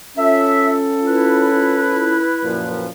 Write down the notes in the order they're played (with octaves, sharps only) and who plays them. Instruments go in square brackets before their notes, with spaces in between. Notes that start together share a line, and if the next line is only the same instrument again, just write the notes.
[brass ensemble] C#4 F4 A4 [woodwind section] E5
[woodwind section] E4 B4
[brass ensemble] F#2 A#2 F3